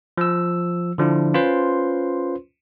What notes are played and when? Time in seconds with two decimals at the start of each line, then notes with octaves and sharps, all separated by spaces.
0.18 F3 E6
0.98 D3 F3 D4 E4 F4
1.34 C#4 F4 B4 C5 C6